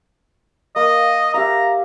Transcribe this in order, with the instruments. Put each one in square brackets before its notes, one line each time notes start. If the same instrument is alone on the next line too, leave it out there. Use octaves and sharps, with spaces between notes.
[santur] A#3 [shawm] D#5
[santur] G4 E5 F5 [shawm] A#5